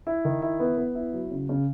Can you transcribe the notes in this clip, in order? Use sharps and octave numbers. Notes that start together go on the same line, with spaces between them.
E4
D#3
E4
B3
B3
E4
F#3
C#3
C#3